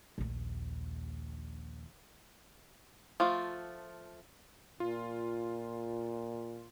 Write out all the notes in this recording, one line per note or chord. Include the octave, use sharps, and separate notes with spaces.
A#1 D#2
F3 A3 F4
A#2 F4